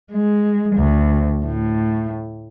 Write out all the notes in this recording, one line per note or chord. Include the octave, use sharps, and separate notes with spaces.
G#3
D2
A2